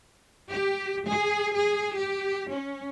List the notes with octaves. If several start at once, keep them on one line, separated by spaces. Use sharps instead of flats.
G4
G#4
G#4
G4
C#4